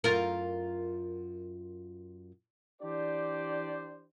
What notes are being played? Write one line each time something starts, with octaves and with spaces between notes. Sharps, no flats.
F#2 F4 A#4
E3 D4 G4 C5 D5